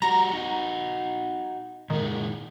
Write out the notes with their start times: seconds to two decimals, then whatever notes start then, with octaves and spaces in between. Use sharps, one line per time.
0.02 G3 F#4 A#5
0.31 D#4 F#4
1.90 A#2 D#3 G#3